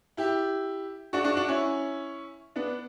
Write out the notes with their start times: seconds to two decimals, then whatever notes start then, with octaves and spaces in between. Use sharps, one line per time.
0.17 E4 G4
1.13 D4 F#4
1.25 D4 F#4
1.37 D4 F#4
1.48 C#4 E4
2.56 B3 D4